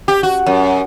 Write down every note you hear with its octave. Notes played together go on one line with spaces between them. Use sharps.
G4
F#4
F#2